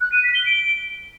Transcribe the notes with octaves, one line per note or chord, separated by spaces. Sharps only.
F#6
D#7
B6
G7
D7